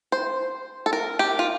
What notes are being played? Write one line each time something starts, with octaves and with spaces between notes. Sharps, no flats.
C5
A4
A#4
G4
F4